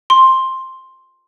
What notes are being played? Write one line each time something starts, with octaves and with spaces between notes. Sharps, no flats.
C6